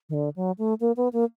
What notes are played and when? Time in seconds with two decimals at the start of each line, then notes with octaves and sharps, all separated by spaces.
0.09 D#3
0.14 D3
0.36 F#3
0.58 A3
0.80 A#3
0.97 B3
1.13 A#3